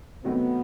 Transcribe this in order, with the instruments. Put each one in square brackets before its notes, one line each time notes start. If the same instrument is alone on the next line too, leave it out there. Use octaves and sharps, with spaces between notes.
[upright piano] C3 D#3 F#3 A3 C4 [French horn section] B3